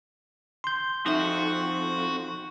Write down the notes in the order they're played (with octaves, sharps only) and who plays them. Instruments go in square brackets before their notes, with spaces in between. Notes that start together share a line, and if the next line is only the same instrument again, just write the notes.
[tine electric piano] C6 G6
[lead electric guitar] F2 [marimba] D#4 E5 [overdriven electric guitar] F#4